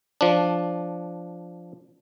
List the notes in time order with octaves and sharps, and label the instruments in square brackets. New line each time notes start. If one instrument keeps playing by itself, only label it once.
[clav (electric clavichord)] F3 D4